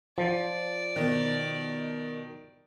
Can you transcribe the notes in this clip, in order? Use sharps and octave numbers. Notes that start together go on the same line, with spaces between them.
F3 D5
B2 D#3